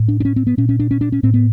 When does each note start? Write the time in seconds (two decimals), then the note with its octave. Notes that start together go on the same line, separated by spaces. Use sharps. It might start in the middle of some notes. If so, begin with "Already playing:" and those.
Already playing: A2
0.08 D4
0.20 D4
0.25 C#4
0.36 C4
0.47 B3
0.57 A#2 C#4
0.69 C#4
0.80 D4
0.91 C#4
1.01 D4
1.12 C#4
1.23 A2 C4
1.34 B3